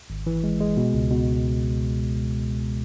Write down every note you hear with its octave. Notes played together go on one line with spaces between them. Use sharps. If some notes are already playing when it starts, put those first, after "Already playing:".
G#1
E3
G#3
G#3
B2
C#2
B2